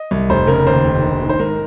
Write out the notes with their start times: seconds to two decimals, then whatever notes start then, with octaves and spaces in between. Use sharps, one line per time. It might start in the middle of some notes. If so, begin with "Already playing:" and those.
Already playing: D#5
0.11 C2
0.29 F1 C5
0.47 C#3 A#4
0.67 D#2 C5
0.85 F1
1.03 A#1
1.22 D#3
1.29 C5
1.39 G#2 A#4